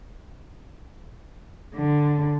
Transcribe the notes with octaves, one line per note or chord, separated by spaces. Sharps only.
D3